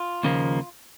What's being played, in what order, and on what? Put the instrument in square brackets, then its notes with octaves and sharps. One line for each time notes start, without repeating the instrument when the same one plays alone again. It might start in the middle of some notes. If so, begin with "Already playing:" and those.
Already playing: [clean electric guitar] F4
D#2 C#3 F3 A#3